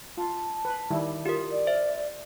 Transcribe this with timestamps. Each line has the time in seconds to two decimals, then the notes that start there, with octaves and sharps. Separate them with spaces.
0.18 F4 A5
0.65 B4
0.91 D#3 G3 E4
1.26 F4 G4 A#4
1.51 D5
1.67 C5 E5